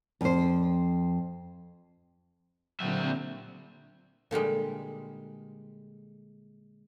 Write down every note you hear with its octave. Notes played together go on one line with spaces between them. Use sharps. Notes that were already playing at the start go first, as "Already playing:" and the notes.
F2 C5
A#2 D3 F#3 G3 C4 E5
A#2 D3 G3 G#3